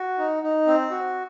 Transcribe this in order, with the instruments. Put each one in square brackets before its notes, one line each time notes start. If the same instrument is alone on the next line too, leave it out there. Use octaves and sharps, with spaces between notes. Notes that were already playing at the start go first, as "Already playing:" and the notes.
Already playing: [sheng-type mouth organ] F#4
D#4
D#4
C4
F#4